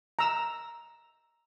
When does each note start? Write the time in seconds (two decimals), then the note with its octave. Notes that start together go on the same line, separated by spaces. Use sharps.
0.19 A#5 E6